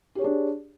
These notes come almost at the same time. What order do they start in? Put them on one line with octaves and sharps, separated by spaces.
G4 C#5 G#4 D4